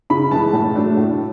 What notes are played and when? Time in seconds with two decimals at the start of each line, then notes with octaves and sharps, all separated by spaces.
0.10 C#3 B5
0.31 E3 G#3 A5
0.53 A2
0.76 F#3 A3 D4
0.97 A2